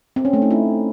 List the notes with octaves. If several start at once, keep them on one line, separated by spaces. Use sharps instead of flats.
C4
C#4
A3
D#4
E4